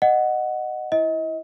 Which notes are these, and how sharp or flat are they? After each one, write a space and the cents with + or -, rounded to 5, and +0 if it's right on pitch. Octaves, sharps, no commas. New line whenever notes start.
D#5 -15 F#5 +0
E4 +0 D#5 +35